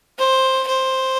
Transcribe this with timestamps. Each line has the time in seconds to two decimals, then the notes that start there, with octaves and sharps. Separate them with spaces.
0.19 C5
0.68 C5